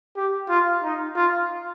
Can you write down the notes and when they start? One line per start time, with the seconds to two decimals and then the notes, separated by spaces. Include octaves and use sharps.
0.17 G4
0.49 F4
0.83 D#4
1.16 F4